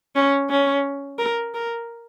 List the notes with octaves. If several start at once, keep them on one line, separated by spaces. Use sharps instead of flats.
C#4
C#4
A#4
A#4